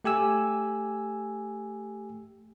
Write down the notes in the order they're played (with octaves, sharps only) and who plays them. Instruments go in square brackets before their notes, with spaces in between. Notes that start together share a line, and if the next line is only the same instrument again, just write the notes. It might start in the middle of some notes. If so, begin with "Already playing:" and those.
[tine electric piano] A3 G4 G#5 E6